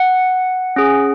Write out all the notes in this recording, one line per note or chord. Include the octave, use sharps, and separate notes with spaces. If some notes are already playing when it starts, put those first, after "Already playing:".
Already playing: F#5
C#4 G#4